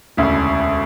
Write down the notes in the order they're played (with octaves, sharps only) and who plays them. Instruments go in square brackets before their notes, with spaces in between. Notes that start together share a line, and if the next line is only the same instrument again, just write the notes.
[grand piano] E1 D2 C#3